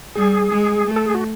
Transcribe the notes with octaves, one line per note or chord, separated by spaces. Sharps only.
G3 G#4
G#3
A3
A4
G#4
F#4